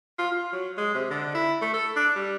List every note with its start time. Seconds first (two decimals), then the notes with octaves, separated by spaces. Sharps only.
0.19 F4
0.31 F4
0.53 F#3
0.78 G#3
0.94 C3
1.10 D3
1.35 E4
1.62 A3
1.74 A4
1.96 D4
2.16 G3